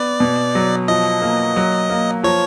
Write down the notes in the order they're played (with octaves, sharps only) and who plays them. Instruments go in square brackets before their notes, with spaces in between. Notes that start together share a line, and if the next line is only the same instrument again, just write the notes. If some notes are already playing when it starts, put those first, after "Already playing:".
Already playing: [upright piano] B3 [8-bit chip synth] D5
[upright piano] B2
F#3
[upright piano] F3 [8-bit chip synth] D#5
[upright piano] A#3
F#3
A#3
[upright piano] F3 [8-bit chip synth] C#5